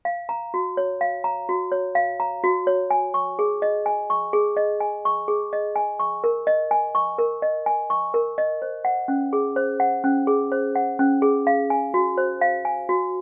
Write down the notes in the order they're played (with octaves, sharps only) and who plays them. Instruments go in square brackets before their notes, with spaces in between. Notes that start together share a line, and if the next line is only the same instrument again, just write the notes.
[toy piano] F5
A#5
F#4
C#5
F5
A#5
F#4
C#5
F5
A#5
F#4
C#5
G#5
C#6
G#4
D#5
G#5
C#6
G#4
D#5
G#5
C#6
G#4
D#5
G#5
C#6
A#4
D#5
G#5
C#6
A#4
D#5
G#5
C#6
A#4
D#5
C5
F#5
C#4
G#4
C5
F#5
C#4
G#4
C5
F#5
C#4
G#4
F5
G#5
F#4
C5
F5
G#5
F#4